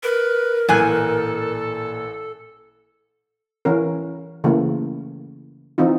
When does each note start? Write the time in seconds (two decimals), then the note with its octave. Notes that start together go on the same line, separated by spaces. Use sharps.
0.03 A#4 B4
0.69 A1 A#2 A4 G#5 F#6
3.65 E3 C#4 A#4
4.44 C#3 E3 A3 A#3
5.78 E3 C4 D#4 F4